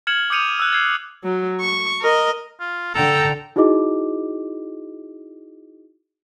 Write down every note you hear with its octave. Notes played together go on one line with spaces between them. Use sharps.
F6 G#6 C#7 E7 F#7
D6 D#6 G6 C#7 D#7 F7
E6 F#6
G#6 C7
F#3
C#6
A#4 D#5
F4
D3 A4 G5 A#5
D#4 E4 F#4 G#4 D#5 D6